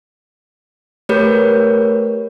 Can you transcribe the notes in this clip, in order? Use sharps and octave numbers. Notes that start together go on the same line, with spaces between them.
A3 G4 A#4 B4 C#5 G6